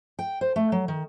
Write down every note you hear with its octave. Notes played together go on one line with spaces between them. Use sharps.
G5
C5
A3
F#3
D#3